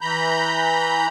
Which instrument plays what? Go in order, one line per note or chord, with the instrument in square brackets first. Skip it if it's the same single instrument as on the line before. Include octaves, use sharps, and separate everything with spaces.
[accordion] E3 A#5 B5 G6